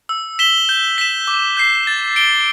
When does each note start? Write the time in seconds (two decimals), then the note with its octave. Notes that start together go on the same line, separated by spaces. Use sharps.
0.09 E6
0.39 B6 E7 G7
0.69 G6
0.98 B6 E7
1.27 D6
1.57 G6 C7
1.87 A6
2.16 D7 G7